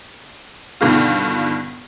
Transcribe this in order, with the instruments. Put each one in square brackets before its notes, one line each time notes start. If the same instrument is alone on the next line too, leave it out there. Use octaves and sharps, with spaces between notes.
[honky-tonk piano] G2 B2 D3 D#3 F4